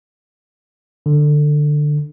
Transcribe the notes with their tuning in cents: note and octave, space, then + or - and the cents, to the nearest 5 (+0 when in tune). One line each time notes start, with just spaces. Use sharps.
D3 +15